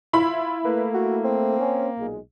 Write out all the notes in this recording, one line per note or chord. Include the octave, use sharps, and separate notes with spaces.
E4 F4 B5
A3 A#3 B4
F#4
C4
C#4
B1 A#2 G#3